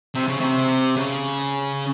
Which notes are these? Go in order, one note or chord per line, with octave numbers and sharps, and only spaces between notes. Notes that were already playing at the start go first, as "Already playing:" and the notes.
C3
C#3
C3
C#3